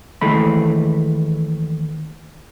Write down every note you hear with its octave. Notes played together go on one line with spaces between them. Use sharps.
D#2 D#3 E3 G#3 A3 B5